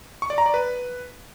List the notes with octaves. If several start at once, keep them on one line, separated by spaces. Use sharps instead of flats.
C#6
D5
A#5
D5
B4